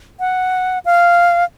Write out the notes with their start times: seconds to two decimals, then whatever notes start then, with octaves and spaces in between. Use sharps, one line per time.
0.20 F#5
0.85 F5